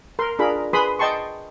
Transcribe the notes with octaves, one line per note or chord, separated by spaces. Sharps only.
A#4 C6
D4 F4 G#4 A#4 B5
G#4 B4 B5 C6 D#6
D#5 G5 A5 C6 C#6